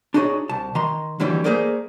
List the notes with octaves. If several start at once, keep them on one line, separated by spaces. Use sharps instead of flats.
D4 D#4 F#4 G#4 C5 C#5
C2 A5
D#3 D#5 A#5 C6
D#2 D3 E3 F#3 G3 C#4
A3 A#3 G#4 A#4 C5 D5